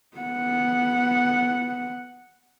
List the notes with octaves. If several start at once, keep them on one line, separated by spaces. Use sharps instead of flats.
B3 F#5